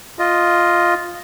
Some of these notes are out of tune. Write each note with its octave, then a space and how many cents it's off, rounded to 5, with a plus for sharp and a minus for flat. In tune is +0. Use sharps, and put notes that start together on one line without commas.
F4 +0 D#5 +0